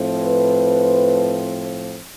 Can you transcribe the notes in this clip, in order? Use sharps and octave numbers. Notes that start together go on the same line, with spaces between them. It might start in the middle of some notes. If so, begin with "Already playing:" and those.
Already playing: A2 F3 C4
B4